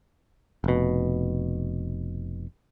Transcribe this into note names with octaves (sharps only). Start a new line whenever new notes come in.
F1 B2